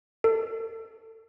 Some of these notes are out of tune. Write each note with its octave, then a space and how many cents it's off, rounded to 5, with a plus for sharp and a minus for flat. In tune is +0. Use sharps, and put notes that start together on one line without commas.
A4 +25